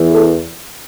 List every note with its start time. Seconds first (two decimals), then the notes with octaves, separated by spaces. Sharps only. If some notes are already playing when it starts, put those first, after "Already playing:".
Already playing: E2 E3
0.13 A4